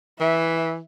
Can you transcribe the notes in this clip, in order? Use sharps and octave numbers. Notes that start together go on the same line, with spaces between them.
E3 E5